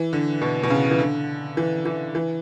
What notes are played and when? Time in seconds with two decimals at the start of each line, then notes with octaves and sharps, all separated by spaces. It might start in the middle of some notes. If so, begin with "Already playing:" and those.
Already playing: E3
0.13 D3
0.42 B2
0.63 B2
0.70 C#3
0.91 E3
0.99 D3
1.57 E3
1.86 E3
2.15 E3